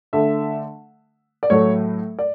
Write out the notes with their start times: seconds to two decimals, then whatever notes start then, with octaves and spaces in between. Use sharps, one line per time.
0.13 D3 A3 E5
1.43 D5
1.50 A2 F#3 A3 C#5
2.19 D5